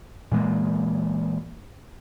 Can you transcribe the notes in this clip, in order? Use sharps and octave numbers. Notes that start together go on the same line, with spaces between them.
A#2 E3 G#3 A#3